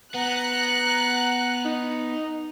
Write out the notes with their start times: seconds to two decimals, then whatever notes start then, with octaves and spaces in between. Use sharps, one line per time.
0.14 B3 F#5 A#5 F#6
1.65 D#4